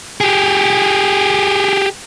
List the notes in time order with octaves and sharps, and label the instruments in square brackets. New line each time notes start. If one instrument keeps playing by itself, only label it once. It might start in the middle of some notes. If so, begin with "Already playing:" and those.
[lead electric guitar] G4 G#4